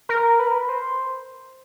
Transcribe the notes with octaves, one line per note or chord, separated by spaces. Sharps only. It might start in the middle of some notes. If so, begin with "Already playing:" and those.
A#4
B4
A#4
B4
C5